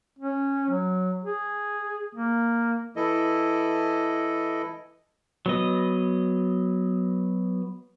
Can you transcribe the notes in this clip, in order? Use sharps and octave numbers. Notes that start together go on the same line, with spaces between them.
C#4
F#3
G#4
A#3
E3 E4 A4 D#5
F#3 B3 D#5